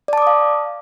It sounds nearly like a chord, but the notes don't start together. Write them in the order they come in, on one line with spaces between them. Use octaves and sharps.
D5 A5 D6 D#6 F5